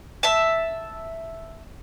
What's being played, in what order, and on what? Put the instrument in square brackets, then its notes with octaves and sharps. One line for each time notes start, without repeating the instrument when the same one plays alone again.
[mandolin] E5 A5